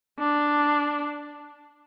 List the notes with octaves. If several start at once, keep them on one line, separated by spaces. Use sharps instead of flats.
D4